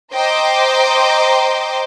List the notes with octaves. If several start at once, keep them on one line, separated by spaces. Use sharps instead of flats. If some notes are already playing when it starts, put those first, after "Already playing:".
C5 D#5 G5 A#5 C6 D6